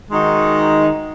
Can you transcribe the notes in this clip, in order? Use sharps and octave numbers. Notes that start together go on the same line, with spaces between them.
D#3 G#3 D#4 F#4